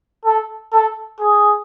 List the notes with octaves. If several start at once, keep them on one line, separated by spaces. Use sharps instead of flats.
A4
A4
G#4